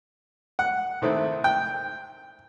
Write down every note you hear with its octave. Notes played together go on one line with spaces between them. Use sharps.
F#5
C3 D#3 A3 C4 E4
G5